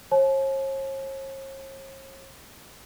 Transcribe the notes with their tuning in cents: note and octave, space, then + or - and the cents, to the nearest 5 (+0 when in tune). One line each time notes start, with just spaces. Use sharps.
C#5 -45 A5 -45